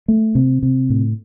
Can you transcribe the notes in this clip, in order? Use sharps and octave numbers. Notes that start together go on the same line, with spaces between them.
A3
C3
C3
A2